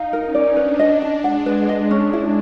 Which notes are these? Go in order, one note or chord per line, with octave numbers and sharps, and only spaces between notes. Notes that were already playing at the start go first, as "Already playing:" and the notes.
Already playing: D#4 F5
A#4
C#4
D5
D4 B4
D#5
A5
G#3 F#5
B4
D#5
C#4
E4